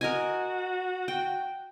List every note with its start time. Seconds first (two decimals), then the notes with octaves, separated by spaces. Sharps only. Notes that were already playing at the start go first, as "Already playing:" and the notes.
0.01 F#4 A#4 D#5 G#5
1.08 G5